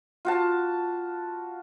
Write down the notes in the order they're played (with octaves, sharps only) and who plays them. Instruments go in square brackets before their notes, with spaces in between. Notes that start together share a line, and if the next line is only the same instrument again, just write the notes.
[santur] F4 F#4 A5